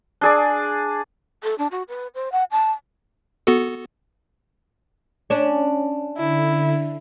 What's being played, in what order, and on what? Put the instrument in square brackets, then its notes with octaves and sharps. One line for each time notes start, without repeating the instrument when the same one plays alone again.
[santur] D4 G#4 D5
[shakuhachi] A4
D4
F#4
B4
C5
F#5
A5
[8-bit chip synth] B3 F#4 A4
[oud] C#4 D4
[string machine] D3 [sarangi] E4